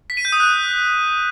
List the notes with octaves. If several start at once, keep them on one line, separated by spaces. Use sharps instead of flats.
B6
D#7
G6
D#6
F#6